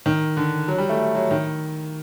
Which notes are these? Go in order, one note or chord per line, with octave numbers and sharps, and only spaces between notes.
D#3
D3
F#3
G3
A3
F#3
D#3